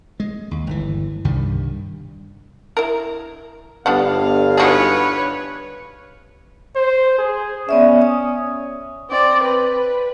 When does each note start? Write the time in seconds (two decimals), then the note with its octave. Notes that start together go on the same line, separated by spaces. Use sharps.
0.20 G#3
0.51 D#2
0.67 G1 E3
1.25 C2 G2 D#3 G3
2.77 E4 A#4
3.86 G1 G2 B3 D4 F5 F#5
4.57 D#4 F#4 G#4 B4 C#5
6.76 C5
7.19 G#4
7.69 B3 C#4 D5 E5
8.02 D#6
9.11 C4 D5
9.43 B4